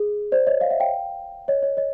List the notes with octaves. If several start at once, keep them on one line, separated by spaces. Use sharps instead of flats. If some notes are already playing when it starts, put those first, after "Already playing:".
Already playing: G#4
C5 D5
C#5 D#5
D#5 F5
E5 F#5
F5 G5
C#5 D#5
C#5 D#5
C#5 D#5